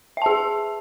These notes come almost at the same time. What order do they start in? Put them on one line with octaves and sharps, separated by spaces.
E5 A5 G#4